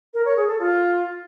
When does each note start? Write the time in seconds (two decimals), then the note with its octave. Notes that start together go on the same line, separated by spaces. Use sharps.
0.14 A#4
0.25 C#5
0.37 G#4
0.48 A4
0.60 F4